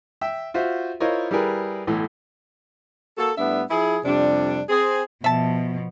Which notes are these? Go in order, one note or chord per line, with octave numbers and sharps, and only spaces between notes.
E5 G5 E6
F4 F#4 C5 E5
E4 F4 A#4 C5 C#5 D#5
G3 E4 G4 G#4 A#4 B4
B1 A2 E3
A#3 F#4 A4
A2 G3 B3 D4 E5
F3 E4 G#4
F2 C3 G3 D4
C4 G#4
B2 F3 E5 A5